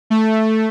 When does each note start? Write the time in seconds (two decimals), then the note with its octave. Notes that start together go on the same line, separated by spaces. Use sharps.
0.10 A3